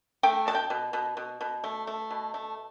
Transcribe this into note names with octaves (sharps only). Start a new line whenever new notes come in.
A3 G5
B2 A5
G5
B2
B2
B2
B2
A3
A3
B2
A3